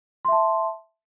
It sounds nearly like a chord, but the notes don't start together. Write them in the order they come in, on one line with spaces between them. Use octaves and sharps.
C6 E5 A5